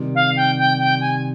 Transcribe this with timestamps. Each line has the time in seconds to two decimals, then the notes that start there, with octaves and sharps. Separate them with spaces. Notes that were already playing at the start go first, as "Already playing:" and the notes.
Already playing: C3 D#3 G3
0.15 F5
0.36 G5
0.58 G5
0.80 G5
1.01 G#5